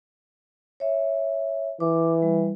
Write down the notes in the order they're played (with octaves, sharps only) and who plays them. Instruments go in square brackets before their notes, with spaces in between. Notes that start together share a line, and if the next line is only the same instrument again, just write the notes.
[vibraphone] C#5 E5
[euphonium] E3 [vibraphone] D6
[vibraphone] G3